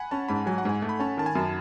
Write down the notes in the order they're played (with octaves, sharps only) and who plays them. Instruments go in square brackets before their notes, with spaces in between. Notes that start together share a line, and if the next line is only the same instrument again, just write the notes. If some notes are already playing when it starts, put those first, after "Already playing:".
Already playing: [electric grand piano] F#5 G#5 B5
[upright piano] C#4 [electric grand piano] A5
[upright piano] G#2 [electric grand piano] B5
[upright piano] F#3 [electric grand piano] G#5
[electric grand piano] F#5
[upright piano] G#2 [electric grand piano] G#5
[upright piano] A3
[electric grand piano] B5
[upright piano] C#4 [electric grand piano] A5
[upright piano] D#3 [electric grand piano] A5
[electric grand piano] G#5
[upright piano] F#2